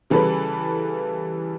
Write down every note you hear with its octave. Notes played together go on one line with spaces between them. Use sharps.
C#3 E3 G3 A4 B4